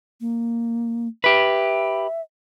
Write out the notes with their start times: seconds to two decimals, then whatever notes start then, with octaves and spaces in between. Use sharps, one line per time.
0.21 A#3
1.24 G4 B4 E5